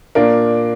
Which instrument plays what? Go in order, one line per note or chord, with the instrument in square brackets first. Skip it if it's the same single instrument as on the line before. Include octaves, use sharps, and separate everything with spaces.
[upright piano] A#2 A#3 D4